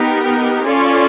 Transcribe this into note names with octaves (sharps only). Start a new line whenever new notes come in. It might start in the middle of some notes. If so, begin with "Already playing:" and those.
Already playing: B3 D#4 G4 A#4
C#4 F4 A4 D5